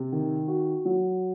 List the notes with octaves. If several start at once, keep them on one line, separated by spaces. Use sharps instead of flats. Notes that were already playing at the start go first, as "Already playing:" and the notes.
Already playing: C3
D#3
F#4
F#3